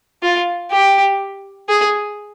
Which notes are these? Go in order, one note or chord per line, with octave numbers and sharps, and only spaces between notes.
F4
G4
G#4